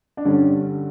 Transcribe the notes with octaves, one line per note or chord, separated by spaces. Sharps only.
D4
G2 D3 G3 C#4